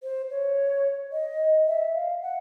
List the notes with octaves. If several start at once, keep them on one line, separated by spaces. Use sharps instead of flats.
C5
C#5
D#5
E5
F5
F#5